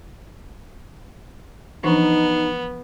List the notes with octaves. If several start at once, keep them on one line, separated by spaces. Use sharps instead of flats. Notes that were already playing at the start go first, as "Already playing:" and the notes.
E3 F3 B3 D4 D#4